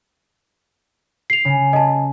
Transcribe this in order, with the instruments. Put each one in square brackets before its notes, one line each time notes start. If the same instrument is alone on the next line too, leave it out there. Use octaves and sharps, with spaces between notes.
[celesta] C7 F7
[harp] C#3
[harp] G#4 [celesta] D#5 A5